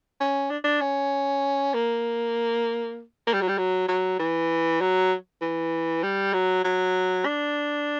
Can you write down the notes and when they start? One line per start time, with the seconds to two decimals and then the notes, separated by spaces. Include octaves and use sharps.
0.20 C#4
0.50 D4
0.64 D4
0.81 C#4
1.74 A#3
3.27 A#3
3.34 G3
3.41 F#3
3.49 G3
3.58 F#3
3.88 F#3
4.19 E3
4.81 F#3
5.42 E3
6.03 G3
6.33 F#3
6.64 F#3
7.25 D4